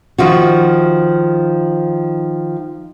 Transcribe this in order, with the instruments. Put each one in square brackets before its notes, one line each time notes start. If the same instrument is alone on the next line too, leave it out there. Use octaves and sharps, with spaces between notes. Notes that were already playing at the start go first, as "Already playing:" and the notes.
[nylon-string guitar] D#3 F3 F4 F#4